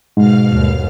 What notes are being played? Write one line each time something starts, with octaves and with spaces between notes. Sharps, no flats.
G#2 B2 F5 F6
G1 D#2